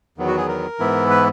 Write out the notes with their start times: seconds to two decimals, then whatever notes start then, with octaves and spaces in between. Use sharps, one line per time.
0.18 E2 D#3 F#3 B3
0.27 F#4
0.37 G#4
0.48 A#4
0.79 G#2 E3 B3 E4
1.10 B4